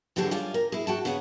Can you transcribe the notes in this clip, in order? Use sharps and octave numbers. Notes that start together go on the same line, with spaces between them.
E2 D3 F#3 G4 G#4 A5
F#2 G3 F4 D5 G#5
A#4
E4 G#4
F#4 G5 A5
C#3 B3 G#4 F#5